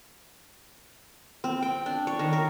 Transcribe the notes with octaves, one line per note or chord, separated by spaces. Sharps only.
C4
G5
D4
C#5
D#3
A#4